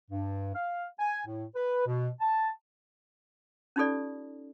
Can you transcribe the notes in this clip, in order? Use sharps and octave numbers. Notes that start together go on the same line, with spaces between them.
G2
F5
G#5
A2
B4
B2
A5
C#4 D#4 F4 G4 A4 D5